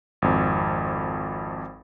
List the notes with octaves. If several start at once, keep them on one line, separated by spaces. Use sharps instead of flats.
G#1 F2